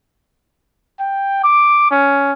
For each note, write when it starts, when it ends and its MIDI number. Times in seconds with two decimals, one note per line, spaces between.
1.00 1.39 79
1.44 1.88 86
1.91 2.33 61